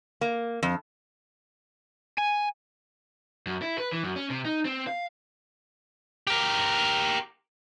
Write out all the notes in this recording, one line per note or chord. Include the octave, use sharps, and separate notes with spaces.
A#3
F2
G#5
F#2
E4
B4
E3
F#2
C#4
C3
D#4
C4
F5
G4 A#4